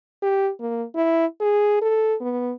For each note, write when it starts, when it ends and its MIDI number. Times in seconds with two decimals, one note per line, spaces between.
0.22 0.51 67
0.60 0.84 58
0.95 1.26 64
1.41 1.81 68
1.82 2.15 69
2.21 2.53 59